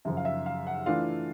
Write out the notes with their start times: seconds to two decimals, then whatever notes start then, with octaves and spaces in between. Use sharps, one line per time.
0.05 F#2 C#3 F3 E5
0.17 F5
0.25 E5
0.46 F5
0.67 F#5
0.86 E3 A3 D4 F4 F5